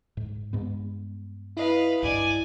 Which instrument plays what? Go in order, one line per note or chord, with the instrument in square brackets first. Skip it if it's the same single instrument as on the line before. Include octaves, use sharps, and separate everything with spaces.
[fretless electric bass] G#2
G2 G#3 B3
[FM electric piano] E4 D#5 [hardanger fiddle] B4 F5
[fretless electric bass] B1 G2 [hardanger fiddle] D5 G#5